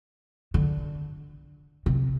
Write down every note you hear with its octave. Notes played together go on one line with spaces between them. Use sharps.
D3
C3